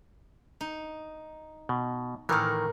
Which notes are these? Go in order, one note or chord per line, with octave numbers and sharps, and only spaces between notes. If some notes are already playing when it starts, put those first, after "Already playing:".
D#4
B2
A2 D#3 E3 A#4